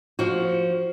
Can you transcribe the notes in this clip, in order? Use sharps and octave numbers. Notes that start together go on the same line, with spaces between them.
F3 F#4